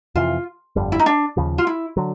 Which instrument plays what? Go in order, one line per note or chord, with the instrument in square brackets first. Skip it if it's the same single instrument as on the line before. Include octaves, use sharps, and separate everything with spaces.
[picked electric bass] F2 C3 E3 [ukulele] F4
[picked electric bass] G1 F2 D3 G3
[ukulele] E4
D#4
D4
[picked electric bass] D#2 C#3 F3
[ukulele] F4
E4
[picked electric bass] D3 F#3